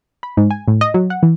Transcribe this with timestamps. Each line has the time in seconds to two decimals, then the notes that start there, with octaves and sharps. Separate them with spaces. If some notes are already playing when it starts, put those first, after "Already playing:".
0.23 B5
0.37 G#2
0.51 G#5
0.68 A2
0.81 D#5
0.94 F#3
1.10 F#5
1.23 E3